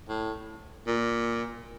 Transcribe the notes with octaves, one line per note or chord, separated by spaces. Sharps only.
A2
A#2